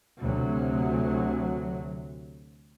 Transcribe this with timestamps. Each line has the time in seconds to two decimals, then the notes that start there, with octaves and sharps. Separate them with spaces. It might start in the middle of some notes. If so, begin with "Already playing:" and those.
0.20 D2 C3 F#3